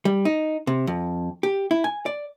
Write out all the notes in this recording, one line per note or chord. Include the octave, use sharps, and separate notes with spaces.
G3
D#4
C3
F2
G4
E4
G#5
D5